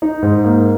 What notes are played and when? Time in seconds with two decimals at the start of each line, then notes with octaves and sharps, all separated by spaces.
0.02 D#4
0.22 G#2
0.44 A#3